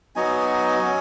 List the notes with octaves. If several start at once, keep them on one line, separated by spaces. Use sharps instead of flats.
F#3 B3 D#4 F#4 D#5 G#5
F#3 C#4 F#4